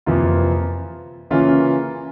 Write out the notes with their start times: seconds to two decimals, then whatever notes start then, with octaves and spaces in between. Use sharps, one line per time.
0.06 F2 C3 E3 A#3 F4
1.30 C#3 E3 A#3 C#4 F4